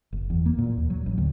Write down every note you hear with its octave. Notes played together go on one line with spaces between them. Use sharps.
F#1
E2
A#3
A#2
D#2
F#3
A1
D2